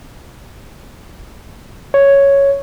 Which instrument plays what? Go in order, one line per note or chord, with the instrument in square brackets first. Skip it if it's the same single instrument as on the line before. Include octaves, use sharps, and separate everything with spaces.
[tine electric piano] C#5